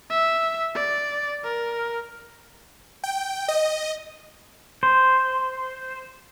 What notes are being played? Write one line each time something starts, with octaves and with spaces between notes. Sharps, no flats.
E5
D5
A#4
G5
D#5
C5